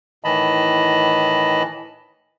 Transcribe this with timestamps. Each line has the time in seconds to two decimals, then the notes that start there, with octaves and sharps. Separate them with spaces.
0.24 A2 D#3 E3 D#5 A5 B5